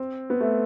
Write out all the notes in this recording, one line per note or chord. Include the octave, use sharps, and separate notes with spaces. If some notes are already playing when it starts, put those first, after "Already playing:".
Already playing: C4
B3
A3